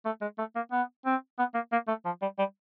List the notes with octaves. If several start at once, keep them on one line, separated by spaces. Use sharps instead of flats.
A3
G#3
A3
A#3
B3
C4
B3
A#3
A#3
A3
F3
G3
G3